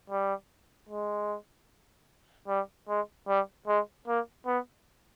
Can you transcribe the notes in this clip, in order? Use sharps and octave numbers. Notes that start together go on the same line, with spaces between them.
G3
G#3
G3
G#3
G3
G#3
A#3
B3